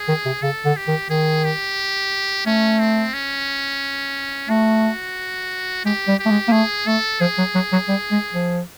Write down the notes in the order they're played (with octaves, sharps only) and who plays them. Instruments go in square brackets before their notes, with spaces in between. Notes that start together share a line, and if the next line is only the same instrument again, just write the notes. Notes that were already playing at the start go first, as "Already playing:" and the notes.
Already playing: [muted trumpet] G#4
[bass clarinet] D#3
C3
[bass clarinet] C#3 [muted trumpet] A4
[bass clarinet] D3
[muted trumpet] G4
[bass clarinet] D#3
[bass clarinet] D#3 [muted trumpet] G#4
[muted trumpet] G4
[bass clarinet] A3 [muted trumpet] C#4
[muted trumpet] C4
C#4
[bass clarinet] A3 [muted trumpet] F#4
[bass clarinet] G#3 [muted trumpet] G4
[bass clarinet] G3
[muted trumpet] G4
[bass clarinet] A3
G#3
A#3
[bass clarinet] A3 [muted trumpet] G#4
[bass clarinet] A3 [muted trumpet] A4
[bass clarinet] F3 [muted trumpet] G#4
[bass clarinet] F#3
F#3
F#3
G3
G#3
F3